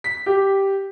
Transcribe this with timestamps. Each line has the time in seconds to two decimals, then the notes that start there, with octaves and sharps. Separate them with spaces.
0.04 B6
0.26 G4